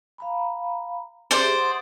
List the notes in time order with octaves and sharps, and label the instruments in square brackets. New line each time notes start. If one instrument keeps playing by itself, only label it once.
[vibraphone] F5 A#5 B5
[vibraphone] G4 G#4 E5 [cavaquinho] C5 D5
[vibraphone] F#5 D#6